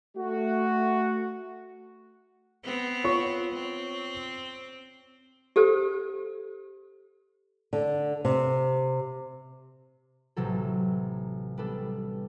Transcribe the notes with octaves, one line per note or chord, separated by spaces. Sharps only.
A3 F#4
B3 C4
F4 C#5 C#6
C4
G4 A4 C5
D3
C3
A1 C3 F#3 A4
G3 B3 D4 A4